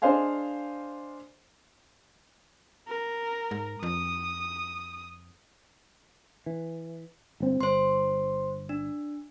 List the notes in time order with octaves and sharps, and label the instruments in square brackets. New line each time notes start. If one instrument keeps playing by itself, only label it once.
[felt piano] D4 G#4 C5 D#5 F5 G#5
[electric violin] A#4
[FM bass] G#2
[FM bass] F2 [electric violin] D#6
[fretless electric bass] E3
G1 C4
[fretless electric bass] G1 [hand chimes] C5 C6
[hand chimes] D4